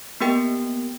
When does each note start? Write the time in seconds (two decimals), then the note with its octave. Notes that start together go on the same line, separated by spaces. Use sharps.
0.21 A#3 B3 G4 A#4 G5